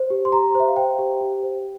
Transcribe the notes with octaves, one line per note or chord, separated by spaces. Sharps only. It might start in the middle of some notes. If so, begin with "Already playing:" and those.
Already playing: C5
G4
C6
G4 A#5
C5 E5
F5
C5 G5
G4
G4
C5